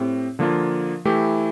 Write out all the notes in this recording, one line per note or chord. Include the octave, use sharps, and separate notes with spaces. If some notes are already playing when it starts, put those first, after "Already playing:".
Already playing: A2 C4 G4
D3 F3 A#3 F4
E3 A3 E4 G4